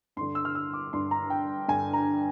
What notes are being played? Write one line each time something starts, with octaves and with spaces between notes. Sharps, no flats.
G2 D3 C6
E6
F6
E6
D6
G2 D3 C6
A#5
G5
G2 D3 G#5
A#5